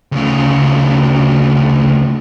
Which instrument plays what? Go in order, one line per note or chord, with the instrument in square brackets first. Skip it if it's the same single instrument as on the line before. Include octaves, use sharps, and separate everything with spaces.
[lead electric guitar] D2 C#3